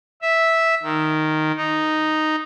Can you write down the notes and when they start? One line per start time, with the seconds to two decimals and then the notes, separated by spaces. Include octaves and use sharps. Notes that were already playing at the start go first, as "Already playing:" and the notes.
0.22 E5
0.83 D#3
1.57 D#4